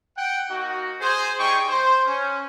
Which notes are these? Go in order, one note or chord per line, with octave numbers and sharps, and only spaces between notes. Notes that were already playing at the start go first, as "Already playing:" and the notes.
F#5 G5
A#3 D#4 F#4
G#4 C5
G3 D#4 G#4 G5 C#6
C5
C#4